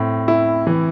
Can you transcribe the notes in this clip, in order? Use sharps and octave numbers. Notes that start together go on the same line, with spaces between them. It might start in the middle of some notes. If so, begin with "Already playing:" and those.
Already playing: A2 C4
E4
E3